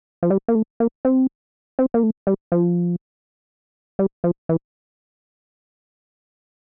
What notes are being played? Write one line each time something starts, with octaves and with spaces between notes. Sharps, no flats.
F3
G3
A#3
A3
A#3
C4
C4
A#3
A3
G3
F3
G3
F3
E3